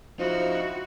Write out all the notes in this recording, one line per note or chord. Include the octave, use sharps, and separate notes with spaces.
F3 D#4 E4 F#4 C5